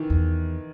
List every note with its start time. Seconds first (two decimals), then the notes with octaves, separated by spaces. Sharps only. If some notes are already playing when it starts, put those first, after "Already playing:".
Already playing: D#3 E3
0.10 E2